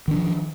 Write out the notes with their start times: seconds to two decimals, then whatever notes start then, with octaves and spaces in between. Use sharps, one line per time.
0.08 D#3
0.11 D4
0.14 F3